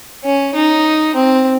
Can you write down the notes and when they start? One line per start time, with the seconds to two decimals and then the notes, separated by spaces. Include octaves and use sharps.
0.24 C#4
0.55 D#4
1.15 C4